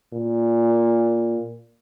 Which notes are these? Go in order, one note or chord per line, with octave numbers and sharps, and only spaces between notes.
A#2